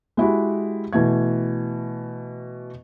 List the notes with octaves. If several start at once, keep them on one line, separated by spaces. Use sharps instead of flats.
G#3 E4 F#4 G4
B2 E3 A3 G#6